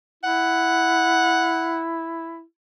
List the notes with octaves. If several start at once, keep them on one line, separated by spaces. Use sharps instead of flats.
E4 F#5